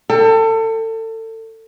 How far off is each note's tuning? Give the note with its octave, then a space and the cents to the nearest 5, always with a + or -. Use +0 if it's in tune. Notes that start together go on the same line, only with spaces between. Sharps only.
A4 +30 G5 +30